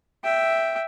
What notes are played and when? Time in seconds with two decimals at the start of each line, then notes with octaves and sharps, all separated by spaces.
0.23 E5 G5